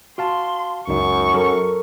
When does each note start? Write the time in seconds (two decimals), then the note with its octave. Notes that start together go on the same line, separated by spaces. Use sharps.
0.18 F#4 F5 A5 C6
0.88 C#2 F#2 D#4 C#6
1.34 F#3 A4 A#4